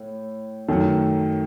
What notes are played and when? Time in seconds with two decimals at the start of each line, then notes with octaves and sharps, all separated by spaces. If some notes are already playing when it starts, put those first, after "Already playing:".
Already playing: A2
0.68 F#2 D#3 A3